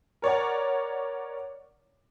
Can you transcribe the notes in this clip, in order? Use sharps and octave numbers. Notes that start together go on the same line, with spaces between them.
A#4 C#5 D5 F#5